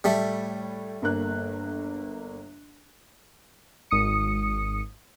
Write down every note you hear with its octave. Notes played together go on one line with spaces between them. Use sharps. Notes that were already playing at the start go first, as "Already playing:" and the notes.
A2 G3 A3 A4
G1 A#3 F#6
G#1 D#6 C#7